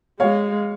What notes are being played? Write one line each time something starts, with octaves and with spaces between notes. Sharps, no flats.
G#3 C#5 F5